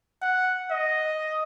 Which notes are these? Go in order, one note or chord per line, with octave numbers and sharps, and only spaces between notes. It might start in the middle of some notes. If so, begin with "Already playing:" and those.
F#5
D#5